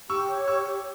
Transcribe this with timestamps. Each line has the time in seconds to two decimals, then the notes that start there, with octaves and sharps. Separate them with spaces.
0.09 G4 C#6 E6
0.28 C#5
0.48 G4 C#6 E6
0.67 G4